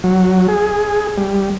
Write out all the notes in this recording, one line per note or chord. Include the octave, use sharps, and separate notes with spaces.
F#3
G#4
G3